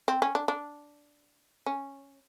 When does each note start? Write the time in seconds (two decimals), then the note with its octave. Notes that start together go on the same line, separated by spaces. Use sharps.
0.08 C4
0.22 C#4
0.35 D4
0.48 D4
1.66 C#4